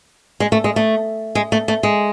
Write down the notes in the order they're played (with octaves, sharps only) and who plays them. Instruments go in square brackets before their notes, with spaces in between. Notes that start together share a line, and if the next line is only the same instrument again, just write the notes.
[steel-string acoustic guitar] G#3
A3
G#3
A3
G#3
A3
A3
G#3